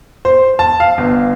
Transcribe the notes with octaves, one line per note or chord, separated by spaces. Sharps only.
C5
A5
F5
G1